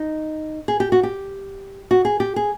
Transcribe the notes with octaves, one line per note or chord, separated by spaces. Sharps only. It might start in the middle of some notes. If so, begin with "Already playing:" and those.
Already playing: D#4
G#4
G4
F#4
G4
F#4
G#4
G4
G#4